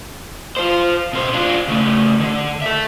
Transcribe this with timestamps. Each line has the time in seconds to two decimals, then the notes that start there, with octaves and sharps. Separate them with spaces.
0.57 F4 C5
1.13 B2 C5
1.33 D4 F4
1.68 C#3 A3
2.20 D3
2.62 A4 E5